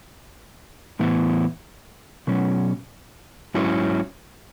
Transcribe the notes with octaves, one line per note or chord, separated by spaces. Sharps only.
A2 E3 B3 E4
B2 F#3 C#4
G#2 F#3 C#4 E4